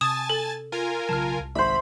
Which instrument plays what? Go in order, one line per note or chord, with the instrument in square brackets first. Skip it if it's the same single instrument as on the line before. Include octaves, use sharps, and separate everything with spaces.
[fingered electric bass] C3 [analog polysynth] G#5 A5 A6 [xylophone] D#6 E7
[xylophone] A4
[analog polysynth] F4 A#4 G#5
[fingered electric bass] B1 C#3 F#3 [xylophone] A5 F6
[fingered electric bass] C2
[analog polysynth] G#1 B5 [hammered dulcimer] C5 E5